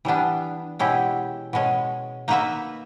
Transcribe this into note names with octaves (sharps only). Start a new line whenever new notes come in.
E3 G3 B3 D4
B2 G#3 C#4 E4 G4
B2 G#3 C#4
A#3 D#4 F#4 B4 E5